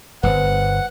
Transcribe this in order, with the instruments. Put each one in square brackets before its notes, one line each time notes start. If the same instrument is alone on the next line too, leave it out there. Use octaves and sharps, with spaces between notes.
[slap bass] D1 G1 [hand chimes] B4 C5 [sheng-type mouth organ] F#5